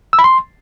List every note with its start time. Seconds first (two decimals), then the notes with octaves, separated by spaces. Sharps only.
0.13 E6
0.19 B5
0.24 C6